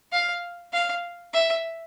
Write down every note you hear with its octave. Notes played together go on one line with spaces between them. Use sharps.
F5
F5
E5